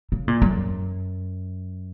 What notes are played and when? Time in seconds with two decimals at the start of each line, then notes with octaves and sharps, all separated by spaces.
0.12 C#3
0.28 A#2
0.42 F#2